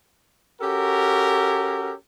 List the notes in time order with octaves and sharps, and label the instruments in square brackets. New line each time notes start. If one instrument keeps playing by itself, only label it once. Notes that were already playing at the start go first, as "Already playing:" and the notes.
[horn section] C#4 F#4 G4 A4 A#4